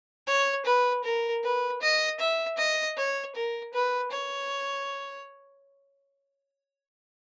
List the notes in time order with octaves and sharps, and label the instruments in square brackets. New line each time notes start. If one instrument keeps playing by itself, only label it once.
[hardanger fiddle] C#5
B4
A#4
B4
D#5
E5
D#5
C#5
A#4
B4
C#5